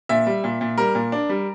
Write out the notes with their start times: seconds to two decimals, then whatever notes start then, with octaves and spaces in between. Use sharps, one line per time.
0.09 A#2 E5
0.26 G3
0.44 A#2
0.61 A#2
0.78 G3 A#4
0.95 A#2
1.12 D4
1.29 G3